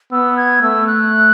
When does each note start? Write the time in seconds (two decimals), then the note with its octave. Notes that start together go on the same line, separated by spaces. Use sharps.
0.12 B3 E6
0.37 G#6
0.62 A3 E6
0.87 F#6